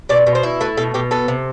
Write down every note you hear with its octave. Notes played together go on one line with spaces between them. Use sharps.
B2 D5
B2
C5
E4
A3 B4
B2 A4
B2 G4
B3 A4
C3